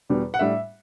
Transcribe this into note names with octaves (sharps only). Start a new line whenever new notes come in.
E2 B2 G3 D4
F#5
A2 G3 D4 E5